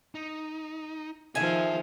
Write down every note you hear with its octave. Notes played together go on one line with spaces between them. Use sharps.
D#4
D#3 F3 G#4 A4 E5 G#5